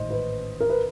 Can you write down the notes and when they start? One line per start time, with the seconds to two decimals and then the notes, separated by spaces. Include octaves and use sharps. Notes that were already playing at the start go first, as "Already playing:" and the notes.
Already playing: A1 G#2 D#3 C5 D#5
0.10 B4
0.60 A#4
0.69 B4